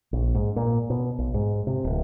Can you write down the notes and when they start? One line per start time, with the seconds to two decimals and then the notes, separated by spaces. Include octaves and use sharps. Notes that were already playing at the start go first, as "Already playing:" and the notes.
0.13 A#1
0.35 G#2
0.56 A#2
0.90 B2
1.19 B1
1.34 G#2
1.67 C3
1.84 D1